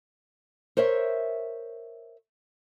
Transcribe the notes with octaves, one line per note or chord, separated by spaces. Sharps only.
A#4 C5 C#5 E5